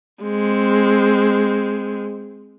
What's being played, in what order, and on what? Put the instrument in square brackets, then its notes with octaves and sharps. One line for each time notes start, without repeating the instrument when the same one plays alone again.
[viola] G#3 C4